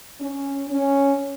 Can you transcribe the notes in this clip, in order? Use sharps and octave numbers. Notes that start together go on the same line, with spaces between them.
C#4
C#4